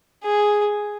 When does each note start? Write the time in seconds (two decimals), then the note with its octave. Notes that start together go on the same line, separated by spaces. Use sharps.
0.24 G#4